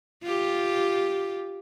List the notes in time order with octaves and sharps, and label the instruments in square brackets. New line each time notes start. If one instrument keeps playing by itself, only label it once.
[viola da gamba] F4 G4